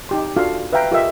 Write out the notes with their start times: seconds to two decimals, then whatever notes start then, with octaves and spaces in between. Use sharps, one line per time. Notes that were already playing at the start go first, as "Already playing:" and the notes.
0.09 D#4 G4 C6
0.36 D4 F4 F#4 A4 F5
0.73 B4 E5 F5 G5 A#5
0.91 F4 G4 A4 A#4 D#5 E5